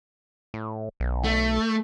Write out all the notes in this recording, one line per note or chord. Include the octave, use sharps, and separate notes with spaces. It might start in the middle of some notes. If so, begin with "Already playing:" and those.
A2
B1
A3